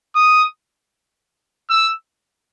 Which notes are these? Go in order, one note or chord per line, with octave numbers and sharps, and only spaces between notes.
D#6
E6